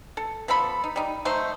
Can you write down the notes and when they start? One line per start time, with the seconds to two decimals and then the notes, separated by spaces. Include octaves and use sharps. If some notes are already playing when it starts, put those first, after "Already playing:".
0.17 A4
0.48 F3 B3 A4 B5
0.84 D#4
0.96 G3 D#4
1.25 F#3 A3 D#4 C5